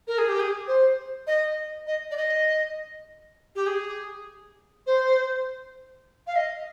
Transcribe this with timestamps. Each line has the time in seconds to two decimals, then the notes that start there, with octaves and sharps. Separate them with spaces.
0.07 A#4
0.18 G#4
0.29 G4
0.39 G#4
0.67 C5
1.27 D#5
1.87 D#5
2.11 D5
2.17 D#5
3.55 G4
3.66 G#4
4.86 C5
6.27 F5
6.36 D#5